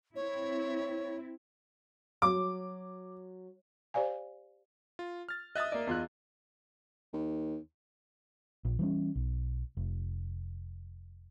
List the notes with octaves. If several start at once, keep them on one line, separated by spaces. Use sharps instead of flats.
C4 E4 C#5
F#3 D6
G4 C5 D5 F5 G#5
F4
F6 A6
D#5 E5 D#6 F#6 A6
A#3 D5
E2 F4 F#6
D#2
A#1
E3 G3 C#4
B1
F1